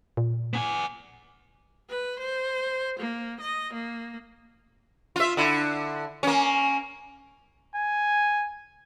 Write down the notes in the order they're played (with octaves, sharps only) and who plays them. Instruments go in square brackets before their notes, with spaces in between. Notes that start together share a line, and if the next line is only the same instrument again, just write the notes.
[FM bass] A#2
[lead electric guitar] B3 G#5
[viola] B4
C5
A#3
D#5
A#3
[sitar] F4 E5
D3 E4
A#3 C#4
[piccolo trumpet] G#5